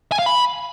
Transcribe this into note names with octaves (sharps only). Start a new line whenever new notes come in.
G#5
F5
B5